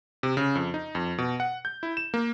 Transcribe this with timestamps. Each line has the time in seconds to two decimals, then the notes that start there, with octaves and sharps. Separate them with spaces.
0.23 C3
0.37 C#3
0.55 F2
0.74 D#4
0.95 F2
1.18 B2
1.40 F#5
1.65 G6
1.83 E4
1.97 E7
2.14 A#3